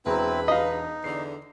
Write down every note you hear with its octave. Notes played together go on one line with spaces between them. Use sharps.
E1 E2 C4 E4 B4 A#5
D#4 D#5 F5
E2 D3 C7